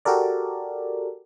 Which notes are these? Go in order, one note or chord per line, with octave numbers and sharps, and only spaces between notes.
F#4 G4 A4 A#4 D5